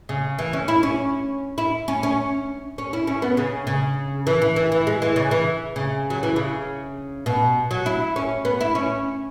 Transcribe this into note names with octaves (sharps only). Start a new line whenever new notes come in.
C#3
E3
C#4
E4
C#4
E4
C#4
C#4
C#4
E4
C#4
B3
C#3
C#3
E3
E3
E3
E3
G#3
E3
C#3
E3
C#3
F#3
E3
C#3
B2
F#3
E4
C#4
B3
E4
C#4